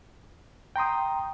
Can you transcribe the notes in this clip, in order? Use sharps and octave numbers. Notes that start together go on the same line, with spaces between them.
G5 A#5 C6 D#6